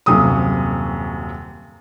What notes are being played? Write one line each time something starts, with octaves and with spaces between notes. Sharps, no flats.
D#1 F#2 C3 D#6